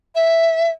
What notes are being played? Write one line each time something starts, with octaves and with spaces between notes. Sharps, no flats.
E5